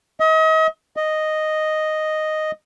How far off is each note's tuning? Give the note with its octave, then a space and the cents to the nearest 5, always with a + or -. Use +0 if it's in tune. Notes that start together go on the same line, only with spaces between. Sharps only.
D#5 +40
D#5 -5